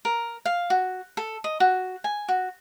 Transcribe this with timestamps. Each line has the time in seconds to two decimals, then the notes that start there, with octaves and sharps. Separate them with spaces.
0.05 A#4
0.45 F5
0.70 F#4
1.17 A4
1.44 D#5
1.60 F#4
2.04 G#5
2.28 F#4